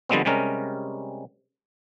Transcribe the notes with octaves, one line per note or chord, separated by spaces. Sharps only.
D3 F3 G3 G#3 B3 C4
C3 G3 G#3 C#4 A#4